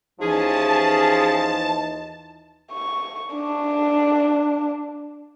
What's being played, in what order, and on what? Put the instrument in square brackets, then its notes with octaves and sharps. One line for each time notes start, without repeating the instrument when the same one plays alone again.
[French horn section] D#2 E3 D#4 [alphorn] F3 [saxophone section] C#4 G#4 [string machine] A5
[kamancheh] C#6
D4